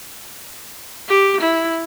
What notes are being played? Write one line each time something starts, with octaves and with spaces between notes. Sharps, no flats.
G4
E4